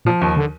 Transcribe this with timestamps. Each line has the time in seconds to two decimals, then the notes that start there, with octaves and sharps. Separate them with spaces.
0.05 A#2 F3
0.21 D#2
0.36 D3